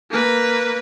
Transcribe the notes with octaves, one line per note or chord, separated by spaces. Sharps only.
A#3 B4